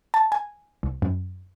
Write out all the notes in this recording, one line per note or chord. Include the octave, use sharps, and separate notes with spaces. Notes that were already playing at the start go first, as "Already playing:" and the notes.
A5
G#5
C2
F#2